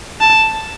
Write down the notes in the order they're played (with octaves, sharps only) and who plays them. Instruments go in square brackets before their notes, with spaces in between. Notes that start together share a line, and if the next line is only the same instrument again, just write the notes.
[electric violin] A5